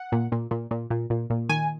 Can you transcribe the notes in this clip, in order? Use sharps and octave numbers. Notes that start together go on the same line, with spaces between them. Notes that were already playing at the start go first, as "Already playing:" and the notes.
Already playing: F#5
A#2
A#2
A#2
A#2
A#2
A#2
A#2
D#3 G#5